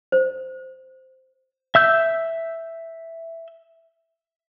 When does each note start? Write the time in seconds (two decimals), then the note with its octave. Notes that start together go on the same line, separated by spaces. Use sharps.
0.12 C5
1.75 E5 E6 G6